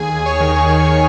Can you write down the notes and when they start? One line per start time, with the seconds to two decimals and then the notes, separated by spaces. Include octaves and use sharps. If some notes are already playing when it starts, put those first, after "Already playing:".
Already playing: D#2 G#4 G#5
0.12 D#2
0.26 C#5 C#6
0.40 D#3
0.69 D#3